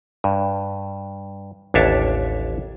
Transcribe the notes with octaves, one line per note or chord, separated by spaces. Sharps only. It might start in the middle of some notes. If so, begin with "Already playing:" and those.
G2
A1 D#2 D4 C#5 E5 A5